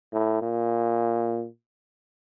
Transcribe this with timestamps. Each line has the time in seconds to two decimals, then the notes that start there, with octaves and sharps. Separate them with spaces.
0.13 A2
0.42 A#2